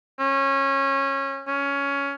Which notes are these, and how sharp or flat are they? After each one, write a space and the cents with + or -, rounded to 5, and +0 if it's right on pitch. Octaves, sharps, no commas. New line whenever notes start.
C#4 -20
C#4 +15